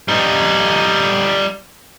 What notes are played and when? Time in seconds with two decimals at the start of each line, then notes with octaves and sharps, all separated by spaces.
0.08 G3 D#4